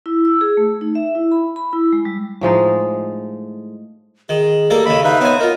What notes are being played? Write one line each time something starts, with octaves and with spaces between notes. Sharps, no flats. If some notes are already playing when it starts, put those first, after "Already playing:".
E4
E6
G#4
A3
D#4
E5
E4
B5
B5
E4
G#3
G3
A2 F3 G#3 D#4
D#3 G#4
G3 A#3 A4 A#4
D#2 C#3 D#5 B5
D#4 B4 E5 F5
B3 C4 C#5 G#5
D#4 F4 A#4